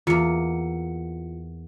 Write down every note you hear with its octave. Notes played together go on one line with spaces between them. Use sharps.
E2 A#3 F4 C#7